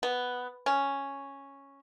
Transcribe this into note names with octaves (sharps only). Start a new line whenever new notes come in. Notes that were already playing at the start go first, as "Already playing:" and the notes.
B3
C#4